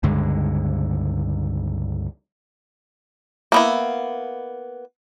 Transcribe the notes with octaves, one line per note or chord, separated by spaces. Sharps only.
C#2 G2 D3 G#3
A#3 B3 E4